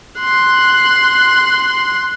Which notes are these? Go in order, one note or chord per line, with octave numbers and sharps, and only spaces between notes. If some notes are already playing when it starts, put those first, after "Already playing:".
C6 F#6